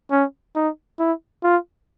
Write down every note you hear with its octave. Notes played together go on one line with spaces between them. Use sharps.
C#4
D#4
E4
F4